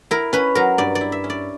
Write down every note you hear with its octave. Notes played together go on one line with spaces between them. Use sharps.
E4 A#4
C#4 B4
F#3 A#4
G2 D5
D5
E4
E5
C#4
D5